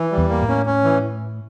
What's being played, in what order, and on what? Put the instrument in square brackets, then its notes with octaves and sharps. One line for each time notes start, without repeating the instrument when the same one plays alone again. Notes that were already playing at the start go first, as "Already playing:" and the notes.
Already playing: [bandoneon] E3
G3
[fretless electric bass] E2
[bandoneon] A#3
[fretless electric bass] A2
[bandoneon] C#4
C#4
E3